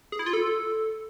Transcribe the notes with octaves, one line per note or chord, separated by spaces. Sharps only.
G#4
E4
F4
A4